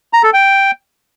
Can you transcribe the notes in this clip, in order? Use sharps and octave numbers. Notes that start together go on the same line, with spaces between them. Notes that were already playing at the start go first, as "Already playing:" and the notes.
A#5
A4
G5